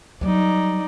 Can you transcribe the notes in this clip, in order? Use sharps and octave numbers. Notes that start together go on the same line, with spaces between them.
F#3 G3 D#4 D5